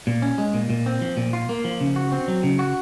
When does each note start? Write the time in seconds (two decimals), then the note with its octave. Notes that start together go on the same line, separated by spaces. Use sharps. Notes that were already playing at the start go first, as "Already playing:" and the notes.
0.07 A#2
0.22 C#4
0.38 G#3
0.54 A#2
0.70 A#2
0.86 C4
1.01 F3
1.17 A#2
1.33 F4
1.49 A#3
1.64 F3
1.81 C#3
1.96 F#4
2.12 C4
2.28 F#3
2.43 C#3
2.59 F#4